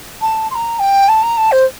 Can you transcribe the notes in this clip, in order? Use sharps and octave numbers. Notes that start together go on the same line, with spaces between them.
A5
C6
A#5
G5
A5
A#5
A5
C5